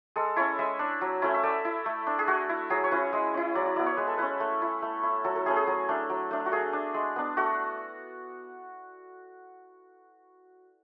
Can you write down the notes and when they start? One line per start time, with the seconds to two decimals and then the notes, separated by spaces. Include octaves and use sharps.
0.16 G#3 A4
0.36 C#4 E4 C#5
0.59 G#3 E5
0.79 D4
1.01 F#3
1.22 A3 C#4 E4
1.34 E5
1.43 A3 D5
1.65 E4
1.86 A3
2.07 D4
2.19 G#4
2.28 A3 F#4
2.49 E4
2.70 F#3 G#4
2.84 C#5
2.91 C#4 E4 B4
3.13 G#3
3.34 C#4 E4
3.55 F#3 D5
3.66 D5
3.76 B3 E4 D5
3.86 C#5
3.97 G#3 B4
4.07 A4
4.18 C#4 E4 B4
4.40 A3
4.62 E4
4.82 A3
5.03 E4
5.24 F#3 A4
5.35 A4
5.46 A3 C#4 E4 G#4
5.56 G#4
5.67 F#3
5.89 A3 D4
6.10 F#3
6.31 A3 D4
6.46 F#4
6.52 A3 G#4
6.73 D4
6.94 G#3
7.16 B3 D4
7.37 A3 F#4